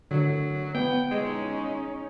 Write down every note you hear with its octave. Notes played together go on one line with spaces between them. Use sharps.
D3 F#3
B3 G5
G#3 C#4 D#4